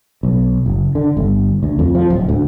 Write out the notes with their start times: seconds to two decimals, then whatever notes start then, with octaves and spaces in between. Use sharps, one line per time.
0.23 B1
0.66 F#1
0.95 D3
1.17 G1
1.63 D2
1.79 F2
1.95 F3
2.10 D1
2.29 D2